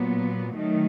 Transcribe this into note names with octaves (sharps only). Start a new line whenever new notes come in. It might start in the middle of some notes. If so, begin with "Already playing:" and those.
Already playing: A#2 F#3 B3
D#3 F#3 A3